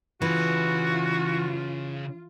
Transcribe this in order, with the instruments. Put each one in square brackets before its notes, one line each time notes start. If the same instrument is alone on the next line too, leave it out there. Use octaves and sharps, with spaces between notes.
[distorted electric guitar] C#3 A4 [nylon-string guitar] E3 [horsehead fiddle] F4 [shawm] F#4